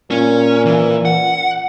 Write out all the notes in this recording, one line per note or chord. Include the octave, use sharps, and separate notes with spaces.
A#2 C#4
E3
F#5